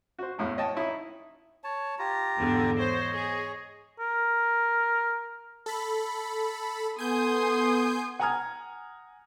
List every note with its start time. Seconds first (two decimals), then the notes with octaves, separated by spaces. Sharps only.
0.19 F#4 C5
0.38 A1 E2 A2
0.57 C#5 D#5 G5 A5
0.75 D#4 E4 C#5
1.64 C#5 A5
1.99 F4 G4 A#5
2.37 E2 G#2 D3
2.78 C5 C#5 D#5
3.16 G#4
4.00 A#4
5.66 A4 B5
6.99 B3 A4 G#5 C6 D#6 G6
8.20 F#5 G#5 A#5 D#6 F6 G#6